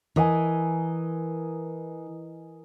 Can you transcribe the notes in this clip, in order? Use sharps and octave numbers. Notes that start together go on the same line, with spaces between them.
E3 A#4 D#5 G#5